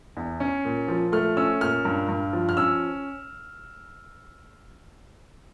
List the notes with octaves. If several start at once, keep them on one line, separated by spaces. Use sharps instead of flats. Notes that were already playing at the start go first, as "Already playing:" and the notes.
E2
C#4
A#2
F3
A3 F6
C#4 E6
A#2 F6
G2
G2
F3
F6
C#4 E6